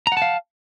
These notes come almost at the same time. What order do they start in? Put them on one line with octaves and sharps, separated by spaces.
A#5 F#5 A5 F5